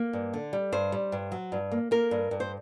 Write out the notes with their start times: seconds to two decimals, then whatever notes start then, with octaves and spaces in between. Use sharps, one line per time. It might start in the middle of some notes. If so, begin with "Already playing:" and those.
Already playing: A#3
0.13 G2
0.34 D3
0.53 G3
0.72 G2 C5
0.92 G3
1.12 G2
1.32 F#3
1.52 G2
1.71 A#3
1.91 A#3 A#4
2.11 G2
2.31 G2
2.40 C5